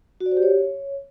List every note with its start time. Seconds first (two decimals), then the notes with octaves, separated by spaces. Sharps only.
0.20 F#4
0.26 D5
0.31 C5
0.37 G4
0.43 C#5